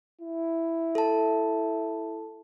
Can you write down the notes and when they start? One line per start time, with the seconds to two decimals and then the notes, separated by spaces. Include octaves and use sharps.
0.21 E4
0.95 A4 A5